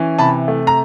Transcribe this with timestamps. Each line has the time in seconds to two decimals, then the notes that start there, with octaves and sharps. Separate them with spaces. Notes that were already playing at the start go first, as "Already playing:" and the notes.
Already playing: E3 C#4
0.19 C3 A5 B5
0.48 A3
0.67 A#5